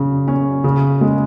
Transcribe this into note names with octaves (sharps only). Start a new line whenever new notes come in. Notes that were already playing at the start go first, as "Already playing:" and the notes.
Already playing: C#3 F#3 G#4
C#4
C#3
G#3